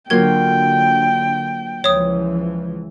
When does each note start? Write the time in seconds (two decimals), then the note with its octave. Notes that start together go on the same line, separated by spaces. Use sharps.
0.10 D3 F#3 A#3 F4 A#4 G5 G#6
1.84 C#2 E3 F3 C#5 D#6